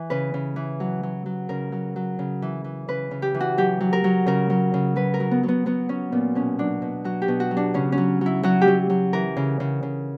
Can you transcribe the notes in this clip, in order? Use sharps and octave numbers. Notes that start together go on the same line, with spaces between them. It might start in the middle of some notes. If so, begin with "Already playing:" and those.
Already playing: E3
C#3 B4
C#3
E3
F#3
F#3
F#3
C#3 A#4
F#3
F#3
C#3
E3
E3
C#3 B4
C#3
G4
E3
F#4
F#3 G4
F#3
A#4
F#3
C#3 A#4
F#3
C#3
F#3 B4
A#4
F#3
B3
F#3
B3
F#3 B3
F#3 C#4
A#2 B3
B2 C#4
F#3 D4
B2
F#3 F#4
G4
B2
F#4
F#3
D4
C#3 C#4
C#4
F#3
F#3 E4
F#3 F#4
G4
F#3
F#3
E3 A#4
C#3
C#3
C#3